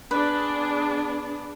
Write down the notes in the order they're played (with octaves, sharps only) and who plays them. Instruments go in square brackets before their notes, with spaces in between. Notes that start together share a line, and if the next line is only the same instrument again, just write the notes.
[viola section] B3 D4 G#4 [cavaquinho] B4